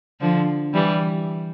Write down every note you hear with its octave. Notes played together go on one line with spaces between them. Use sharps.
D3 F3
E3 G3